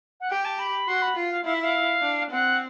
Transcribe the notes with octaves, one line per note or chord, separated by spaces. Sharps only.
F#5
G4 G5
A5
B5
F#4 C6
B5
F4
F5
E4 F5
E5
F5
D4
C4 F#5